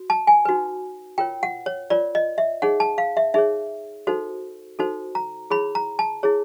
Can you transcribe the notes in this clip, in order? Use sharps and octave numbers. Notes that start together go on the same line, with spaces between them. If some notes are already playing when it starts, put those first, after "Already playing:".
Already playing: F#4
A5
G#5
D#4 F#4 B4
F4 A#4 C#5 G5
F#5
C#5
F4 A#4 C#5 D5
D#5
E5
D#4 G#4 C#5 F#5
A5
F5
E5
D#4 G#4 C#5 E5
D#4 F#4 A4 C5
D#4 F#4 A4 C5
A#5
E4 G#4 C#5 B5
A#5
A5
E4 G#4 C#5